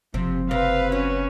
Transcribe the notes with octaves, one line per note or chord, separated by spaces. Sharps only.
F#1 C3 F3
C3 B4 F5
F#3 C#4